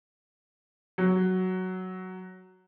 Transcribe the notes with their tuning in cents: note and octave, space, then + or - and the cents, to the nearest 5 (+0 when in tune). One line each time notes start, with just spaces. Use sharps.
F#3 +5